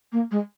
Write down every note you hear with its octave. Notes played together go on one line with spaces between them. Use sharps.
A#3
G#3